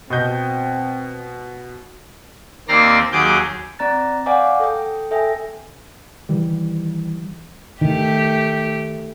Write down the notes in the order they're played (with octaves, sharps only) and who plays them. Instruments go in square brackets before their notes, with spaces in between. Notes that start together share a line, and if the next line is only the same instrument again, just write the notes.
[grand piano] B2 D#5 G6 [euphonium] C4
[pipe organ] D#2 A#3 C4 D5 A#5 C6
D#2 F#3 G#4 D6 G6
[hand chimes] C4 D5 A#5 F#6 A6
C#5 D5 F5 F#5 G#5 D6
A4 G5
A4 E5 G5 G#5
[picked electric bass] D#3 E3 G3
[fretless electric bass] D#3 [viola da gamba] A3 G4